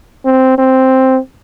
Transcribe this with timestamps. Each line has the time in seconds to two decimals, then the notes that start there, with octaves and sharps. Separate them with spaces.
0.25 C4
0.58 C4